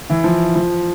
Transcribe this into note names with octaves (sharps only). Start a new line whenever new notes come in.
E3
F3
F3